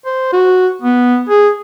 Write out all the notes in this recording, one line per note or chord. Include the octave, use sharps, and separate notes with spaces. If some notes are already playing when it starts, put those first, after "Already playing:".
C5
F#4
B3
G#4